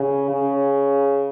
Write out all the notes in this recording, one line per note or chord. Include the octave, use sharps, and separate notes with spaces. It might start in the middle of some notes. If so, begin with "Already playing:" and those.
Already playing: C#3
C#3